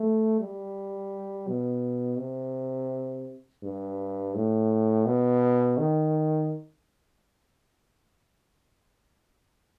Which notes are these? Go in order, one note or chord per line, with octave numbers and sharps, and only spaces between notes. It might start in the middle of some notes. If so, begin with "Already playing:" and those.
Already playing: A3
G3
B2
C3
G2
A2
B2
D#3